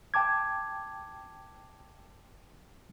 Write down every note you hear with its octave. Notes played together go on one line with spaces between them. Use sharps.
G5 A5 D6 G#6